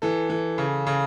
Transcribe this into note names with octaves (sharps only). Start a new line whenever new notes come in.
E3 A4
E3
C#3
C#3